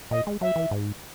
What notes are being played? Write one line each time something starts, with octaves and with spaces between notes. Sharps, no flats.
A#2 D#5
G#3
F#3 E5
E3
G#2